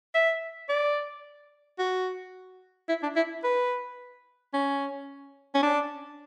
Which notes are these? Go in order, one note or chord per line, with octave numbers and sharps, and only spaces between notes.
E5
D5
F#4
E4
D4
E4
B4
C#4
C#4
D4